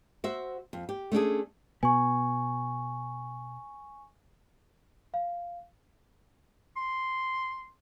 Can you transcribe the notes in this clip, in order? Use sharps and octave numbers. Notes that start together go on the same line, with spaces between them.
F#4 C5 E5
F2
G4
A3 C#4 D4 G#4
B2 B3 G#5 C#6
F5
C6